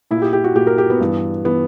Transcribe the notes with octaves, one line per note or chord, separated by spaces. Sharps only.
A#2 E4
G4
G4
F#4
A#2 G4
A#4
G4
B3
G2 E3
E3 B3